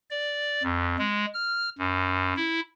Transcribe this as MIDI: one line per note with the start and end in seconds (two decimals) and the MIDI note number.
0.10 0.63 74
0.64 0.97 41
0.99 1.25 56
1.34 1.69 89
1.78 2.33 42
2.37 2.60 64